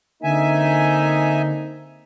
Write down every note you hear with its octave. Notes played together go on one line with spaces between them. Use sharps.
D3 A#3 C4 D#4 E5 G#5